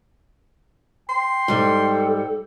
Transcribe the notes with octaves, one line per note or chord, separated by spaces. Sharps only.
G5 C6
G#2 G3 A4